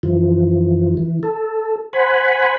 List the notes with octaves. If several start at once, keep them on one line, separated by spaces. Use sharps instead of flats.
F#2 E3 F3
E3
A4
C5 F#5 G#5 B5